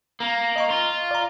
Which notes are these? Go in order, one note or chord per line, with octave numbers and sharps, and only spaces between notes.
A#3
D#5 A#5 C#6
F4
D5 A#5